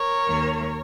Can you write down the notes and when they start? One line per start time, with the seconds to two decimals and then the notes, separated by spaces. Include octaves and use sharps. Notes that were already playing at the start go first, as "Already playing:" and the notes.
Already playing: A#4 C#5
0.28 D#2 D#3 A#3